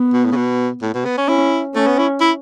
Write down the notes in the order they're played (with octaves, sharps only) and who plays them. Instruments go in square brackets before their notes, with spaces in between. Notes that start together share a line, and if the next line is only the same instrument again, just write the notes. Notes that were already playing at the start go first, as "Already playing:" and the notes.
Already playing: [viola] B3
[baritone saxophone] B2
A2
C#3
B2
A2
B2
B3
C#4
[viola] C#4 [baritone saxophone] E4
[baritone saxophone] A3 [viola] C#4
[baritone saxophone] B3
E4
E4